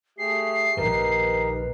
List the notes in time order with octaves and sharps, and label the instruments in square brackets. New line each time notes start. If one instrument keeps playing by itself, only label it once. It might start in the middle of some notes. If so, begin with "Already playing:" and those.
[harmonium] A3 G4 G#4 [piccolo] C7
[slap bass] A#1 A#2 D#3 [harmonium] D#4 G4 A#4 [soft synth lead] B4